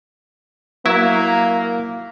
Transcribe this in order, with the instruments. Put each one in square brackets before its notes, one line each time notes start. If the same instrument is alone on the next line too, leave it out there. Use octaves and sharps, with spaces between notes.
[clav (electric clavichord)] F#3 E4 E5 [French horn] A#3